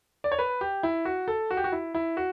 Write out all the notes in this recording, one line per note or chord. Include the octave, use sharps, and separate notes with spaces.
D5
C#5
B4
G4
E4
F#4
A4
F#4
G4
F#4
E4
E4
F#4